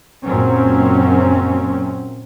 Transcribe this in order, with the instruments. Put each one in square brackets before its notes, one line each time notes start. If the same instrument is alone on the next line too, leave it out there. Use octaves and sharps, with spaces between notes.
[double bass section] F#1 F#2 A#2 F#3 C4 C#4